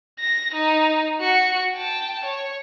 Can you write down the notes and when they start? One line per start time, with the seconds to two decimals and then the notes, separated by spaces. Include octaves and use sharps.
0.19 A#6
0.54 D#4
1.20 F#4 C#7
1.75 G5 A5
2.25 C#5